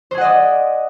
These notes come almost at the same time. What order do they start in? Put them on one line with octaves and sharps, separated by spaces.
C5 G#4 F#5 D#5 D5